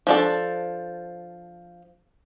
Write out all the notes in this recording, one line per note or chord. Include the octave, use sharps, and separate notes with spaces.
F3 D4 A4